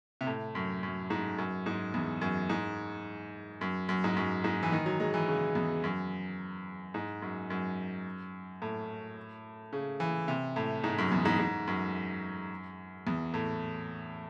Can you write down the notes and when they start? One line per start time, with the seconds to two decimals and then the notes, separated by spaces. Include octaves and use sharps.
0.21 C3
0.27 A2
0.55 F#2
0.83 F#2
1.10 G#2
1.38 F#2
1.66 G#2
1.94 E2
2.21 F#2
2.50 G#2
3.61 F#2
3.89 F#2
4.04 G#2
4.17 F#2
4.44 G#2
4.63 E3
4.72 D#3
4.86 F#3
5.00 G#3
5.14 E3
5.28 C#3
5.55 E2
5.84 F#2
6.94 G#2
7.22 F#2
7.50 F#2
8.62 A2
9.73 C#3
10.00 E3
10.28 C3
10.56 A2
10.84 G#2
10.98 F#2
11.12 E2
11.25 G#2
11.39 G#2
11.67 F#2
13.07 E2
13.34 A2